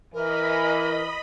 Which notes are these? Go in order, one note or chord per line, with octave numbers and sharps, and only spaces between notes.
E3 A#4 D#5 B5